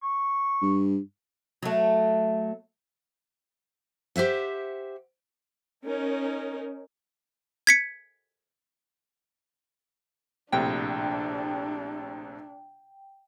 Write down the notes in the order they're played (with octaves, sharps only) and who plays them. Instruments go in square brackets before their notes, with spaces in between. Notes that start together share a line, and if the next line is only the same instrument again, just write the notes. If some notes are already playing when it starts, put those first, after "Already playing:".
[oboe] C#6
[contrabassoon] G2
[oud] F#3 A3
[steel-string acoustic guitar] G4 C5 E5 F#5
[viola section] C#4 D#4 A#4
[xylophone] G#6 B6 C#7
[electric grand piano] A#1 A2 C3 [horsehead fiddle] D4 [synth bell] G5